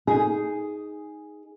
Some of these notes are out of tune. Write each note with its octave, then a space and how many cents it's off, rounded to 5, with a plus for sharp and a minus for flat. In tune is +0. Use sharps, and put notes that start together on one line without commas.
D#4 +10 G#4 +0